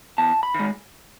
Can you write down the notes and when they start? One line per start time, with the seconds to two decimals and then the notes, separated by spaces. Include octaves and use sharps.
0.18 E2 A5
0.43 B5
0.54 D#3 G#3